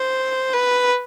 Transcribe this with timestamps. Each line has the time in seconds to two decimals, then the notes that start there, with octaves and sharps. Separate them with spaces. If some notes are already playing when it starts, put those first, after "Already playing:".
Already playing: C5
0.53 B4